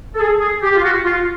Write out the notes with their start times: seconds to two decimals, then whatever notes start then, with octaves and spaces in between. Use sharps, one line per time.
0.15 A4
0.20 G#4
0.40 G#4
0.62 G4
0.75 F4
0.83 F#4
1.04 F4